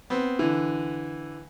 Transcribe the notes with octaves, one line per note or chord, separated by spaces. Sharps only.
B3 C4
D3 E3